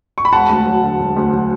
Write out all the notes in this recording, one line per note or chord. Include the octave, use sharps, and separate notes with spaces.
C#6
B5
E1 F#5 A5
D2
F#3
D3
E1
D2
F#3